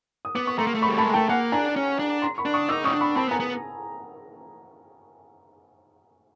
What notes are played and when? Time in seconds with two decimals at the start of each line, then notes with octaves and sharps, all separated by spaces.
0.25 D#6
0.35 B3 D6
0.47 C#6
0.58 A3 A#5 C6
0.67 A#3
0.75 A3
0.82 B5 C#6
0.88 G3
0.98 A5 B5
1.02 G#3
1.14 A3 G5 A5
1.29 A#3 F#5 G#5
1.52 D4 G#5 A#5
1.76 C#4
1.99 D4
2.22 A#5 C6
2.38 B5 C#6
2.45 D4
2.54 C#6 D#6
2.69 D#4 D6 E6
2.84 C#4 C#6 D#6
2.93 D4
3.01 B5 C#6
3.16 C4 A5 B5
3.28 B3
3.31 G#5 A#5
3.40 B3